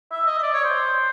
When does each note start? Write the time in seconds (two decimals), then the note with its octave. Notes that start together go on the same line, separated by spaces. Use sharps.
0.11 E5
0.27 D#5
0.39 D#5
0.43 D5
0.54 C#5
0.64 C5